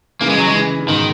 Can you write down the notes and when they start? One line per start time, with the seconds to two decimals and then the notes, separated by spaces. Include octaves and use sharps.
0.20 C#3 E3 A#3
0.30 G#3
0.38 F#3
0.47 G#3
0.54 C#3 E3
0.79 C#3
0.87 G#2 B2 D#3